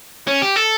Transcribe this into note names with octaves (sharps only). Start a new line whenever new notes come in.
C#4
G4
A4